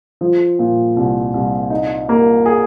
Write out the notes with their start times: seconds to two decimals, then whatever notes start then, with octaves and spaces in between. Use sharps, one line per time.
0.21 F3
0.59 A#2
0.96 C2
1.34 C2
1.70 D#4
2.09 A#3
2.46 G#4